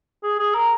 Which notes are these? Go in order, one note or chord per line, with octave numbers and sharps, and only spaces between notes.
G#4
G#4
A#4